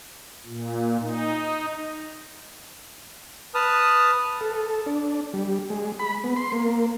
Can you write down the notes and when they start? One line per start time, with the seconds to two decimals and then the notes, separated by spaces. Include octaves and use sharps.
0.46 A#2
1.00 D#4
3.55 B4 A5 D#6 F6
4.41 A4
4.86 D4
5.34 G3
5.70 G#3
5.99 B5
6.24 B3
6.36 C6
6.52 A#3